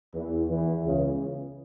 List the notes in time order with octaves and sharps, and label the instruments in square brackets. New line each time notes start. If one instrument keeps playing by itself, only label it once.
[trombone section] E2 E3
E2 E3
C#2 C#3